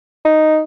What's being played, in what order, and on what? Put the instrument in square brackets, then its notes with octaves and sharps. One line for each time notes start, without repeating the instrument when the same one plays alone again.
[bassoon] D#4